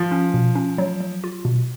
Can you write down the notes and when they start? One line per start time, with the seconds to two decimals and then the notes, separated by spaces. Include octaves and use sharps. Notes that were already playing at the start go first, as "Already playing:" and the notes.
Already playing: F3 F4
0.12 C#4
0.34 B2
0.55 C#4
0.78 F#3
1.00 F#3
1.24 F4
1.45 B2